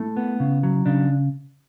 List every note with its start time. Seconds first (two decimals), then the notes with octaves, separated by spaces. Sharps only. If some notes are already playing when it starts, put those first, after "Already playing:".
Already playing: A3 E4
0.17 B3
0.40 C#3
0.63 F#3
0.86 C#3 D4